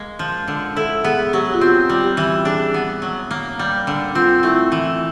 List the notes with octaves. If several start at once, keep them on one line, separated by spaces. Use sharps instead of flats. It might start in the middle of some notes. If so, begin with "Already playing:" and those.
Already playing: G#3 A#3
F3
D3
E4 A4
B3 G#4
F#3 G4
F4
C4 F#4
G3
G4
E3
D4 G#4
B3
F#3
A#3
G3
D3
C4 F4
A3 E4
E3